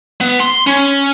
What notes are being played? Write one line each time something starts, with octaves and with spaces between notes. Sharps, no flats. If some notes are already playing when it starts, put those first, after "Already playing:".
B3
C6
C#4